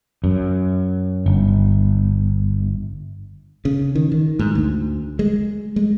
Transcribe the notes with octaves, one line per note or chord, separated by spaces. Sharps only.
F#2
G1
C#3
D#3
D#3
G#2
D2
G#3
G#3